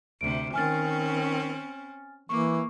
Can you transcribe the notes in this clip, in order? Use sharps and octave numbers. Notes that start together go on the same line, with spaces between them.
D2 C3 D7
D#3 C4 C#4 G#5 F6 A6
E3 A#3 C#6 D6